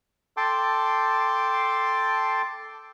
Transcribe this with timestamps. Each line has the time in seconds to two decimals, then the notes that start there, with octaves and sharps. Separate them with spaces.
0.37 A4 G5 A5 C6 D6